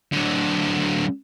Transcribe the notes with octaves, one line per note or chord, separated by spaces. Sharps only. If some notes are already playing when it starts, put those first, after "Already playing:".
D3 F#3